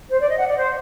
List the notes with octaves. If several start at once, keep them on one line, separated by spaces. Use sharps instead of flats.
C5
D5
D#5
F#5
D5
C5